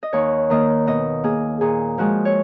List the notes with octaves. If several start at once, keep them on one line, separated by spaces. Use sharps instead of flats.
D#5
D#2 C#5
D#3 A#3 D#5
B2 D#5
A#3 G#4
A#2 G#4
F3 G#3 F#4
C#5